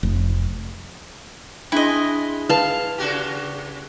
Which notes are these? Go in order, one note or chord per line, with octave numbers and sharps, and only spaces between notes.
F1
G#3 D4 E4 D#5
B4 F5 A5
C#3 F#4 G4